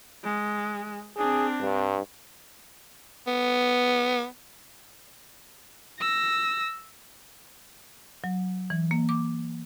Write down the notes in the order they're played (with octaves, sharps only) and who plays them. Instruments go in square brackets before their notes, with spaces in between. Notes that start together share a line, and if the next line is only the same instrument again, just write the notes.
[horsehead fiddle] G#3
[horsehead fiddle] C4 D4 [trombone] G#4
[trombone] G2
[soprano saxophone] B3
[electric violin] E6 A#6
[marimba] F#3
E3
A#3
D6